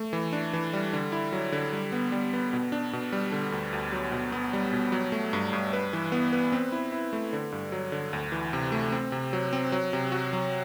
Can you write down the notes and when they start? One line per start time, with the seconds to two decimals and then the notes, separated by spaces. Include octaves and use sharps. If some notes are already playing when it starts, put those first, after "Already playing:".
Already playing: A3
0.13 E3
0.33 D4
0.53 E3
0.73 G3
0.93 D3
1.12 E4
1.32 F#3
1.52 D3
1.73 G3
1.92 B3
2.12 G3
2.33 B3
2.53 B2
2.72 D4
2.93 B2
3.12 G3
3.32 D3
3.52 D2
3.73 D2
3.93 F#3
4.12 B2
4.32 B3
4.53 G3
4.73 B2
4.92 F#3
5.12 A3
5.33 G2
5.53 G2
5.73 B4
5.93 E3
6.12 B3
6.33 B4
6.52 C4
6.72 E4
6.92 E4
7.13 A3
7.33 D3
7.52 G2
7.72 F#3
7.92 D3
8.13 D2
8.32 E3
8.53 C3
8.72 A3
8.92 C4
9.12 C3
9.33 F#3
9.53 C4
9.72 F#3
9.93 C3
10.12 F#4
10.33 F#3